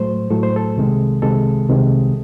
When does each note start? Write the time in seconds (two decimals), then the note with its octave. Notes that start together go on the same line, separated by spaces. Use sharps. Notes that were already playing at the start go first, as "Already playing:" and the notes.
Already playing: A2 F#3 A3 C5
0.30 A2 F#3 A3 A4
0.43 C5
0.56 A4
0.77 C2 C3 D#3 G#3
1.22 C2 C3 D#3 G#3 A4
1.68 C2 C3 D#3 G#3